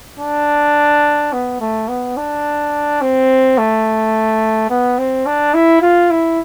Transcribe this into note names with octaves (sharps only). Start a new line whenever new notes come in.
D4
B3
A3
B3
D4
C4
A3
B3
C4
D4
E4
F4
E4